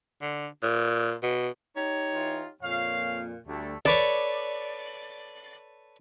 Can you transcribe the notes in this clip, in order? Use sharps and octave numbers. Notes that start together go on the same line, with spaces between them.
D3
A#2
B2
D#4 G4 C#5
E3 F4
F2 A#2 C#5 F5
D2 G3 A3
A4 B4 C#5 D5